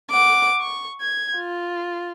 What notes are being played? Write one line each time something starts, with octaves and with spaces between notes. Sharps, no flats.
F#5 D6
C#6
G#6
F4